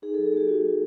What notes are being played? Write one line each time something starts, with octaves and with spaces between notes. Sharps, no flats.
D#4 G#4
F#3 A4
G#4
A#3 G4
D#4 F#4
F#4